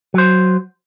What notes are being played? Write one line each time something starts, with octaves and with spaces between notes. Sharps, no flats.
F#3 C5